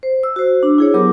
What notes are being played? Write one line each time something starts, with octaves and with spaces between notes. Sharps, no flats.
C5
E6
F#4 C5
D4
E4 G#4 C#5
F#3 B3 G4 A#4 D6